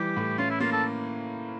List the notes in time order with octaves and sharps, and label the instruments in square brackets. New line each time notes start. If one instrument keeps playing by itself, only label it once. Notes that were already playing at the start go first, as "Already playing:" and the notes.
Already playing: [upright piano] E3 G3 [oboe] G4
[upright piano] A2
[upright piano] C#4 [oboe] F4
[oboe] E4
[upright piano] A#3 [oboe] F4
[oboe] A4